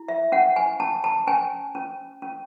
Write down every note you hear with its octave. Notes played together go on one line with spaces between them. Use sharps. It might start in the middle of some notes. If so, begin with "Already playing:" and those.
Already playing: E4
E5
C#4 F#5
G#5
C#4 A5
A5
C#4 G#5
C#4
C#4